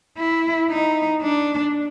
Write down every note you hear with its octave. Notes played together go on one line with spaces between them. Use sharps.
E4
D#4
D4